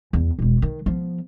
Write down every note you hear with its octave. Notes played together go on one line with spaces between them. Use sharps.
E2
E1 B2
D#3
F3 B3